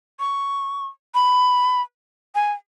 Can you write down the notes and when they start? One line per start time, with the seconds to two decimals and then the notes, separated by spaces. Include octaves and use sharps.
0.20 C#6
1.15 B5
2.35 G#5